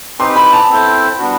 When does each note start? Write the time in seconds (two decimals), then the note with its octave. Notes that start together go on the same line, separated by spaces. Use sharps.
0.19 C4 D#4 G4 B4 C6
0.36 B5
0.53 A5
0.69 C4 E4 A4 C5
1.18 G3 B3 D4 F#4